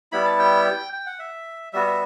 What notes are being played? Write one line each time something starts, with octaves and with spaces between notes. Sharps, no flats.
G3 B3 E4 B5
A5
G5
G5
F#5
E5
G3 B3 F#4 E5
E5